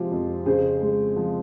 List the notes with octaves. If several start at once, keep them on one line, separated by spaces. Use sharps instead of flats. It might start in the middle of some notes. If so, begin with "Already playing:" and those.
Already playing: C3 F3 G#3 F4 G4 G#4
F2
C#3 G#4 C5
G#3
F3